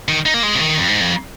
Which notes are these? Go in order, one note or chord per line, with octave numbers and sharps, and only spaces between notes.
D#3
D#4
A#3
G#3
C3
D#3
F2
G#2
F2